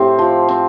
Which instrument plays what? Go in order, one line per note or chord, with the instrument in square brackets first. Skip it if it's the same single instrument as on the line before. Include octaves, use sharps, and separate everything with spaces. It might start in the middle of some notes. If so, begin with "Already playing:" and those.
Already playing: [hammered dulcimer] A2 C4 [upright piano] G4
[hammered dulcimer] F3
C4